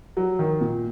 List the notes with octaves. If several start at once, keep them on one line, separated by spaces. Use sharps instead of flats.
F#3
D#3
A#2